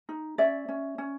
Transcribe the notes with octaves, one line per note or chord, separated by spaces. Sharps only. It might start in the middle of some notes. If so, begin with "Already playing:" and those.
D#4
C#4 D5 E5
C#4
C#4